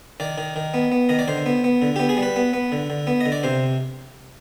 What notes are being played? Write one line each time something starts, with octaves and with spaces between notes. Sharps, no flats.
D#3 D5
D#3
D#3
B3
B3
D#3 D#5
D5
D3 C5
B3
B3
D3
B3 G4
G#4
G3
B4
B3
B3
D3
D3
B3
D3 D#5
D5
C3 C5